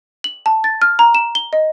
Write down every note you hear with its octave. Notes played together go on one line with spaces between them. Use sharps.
F#7
A5
A6
F6
A#5
E7
G7
D#5